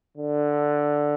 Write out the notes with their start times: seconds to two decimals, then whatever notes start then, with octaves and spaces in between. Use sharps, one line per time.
0.17 D3